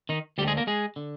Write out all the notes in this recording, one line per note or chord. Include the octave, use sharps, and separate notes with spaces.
D#3 D#4
D2 D3 G3 G#3 G4 G#4
A#3 A#4
G#3 G#4
D3